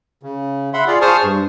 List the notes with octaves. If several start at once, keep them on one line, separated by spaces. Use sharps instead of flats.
C#3
E5 F#5 B5 C6
F4 G#4 D5 F5
G#4 C5 A5 C#6 D#6 F6
G2